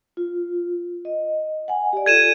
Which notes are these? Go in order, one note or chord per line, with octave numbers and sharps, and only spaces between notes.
F4
D#5
F#5 G#5
G4 D5
F4 A4 G#6 D#7 E7